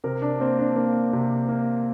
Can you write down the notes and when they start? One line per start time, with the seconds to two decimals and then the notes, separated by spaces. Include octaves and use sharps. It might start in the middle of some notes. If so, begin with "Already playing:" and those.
0.04 C3 A#4
0.22 D4
0.40 A#3 C4
0.59 D4
0.76 A#3
1.13 C3
1.49 A#3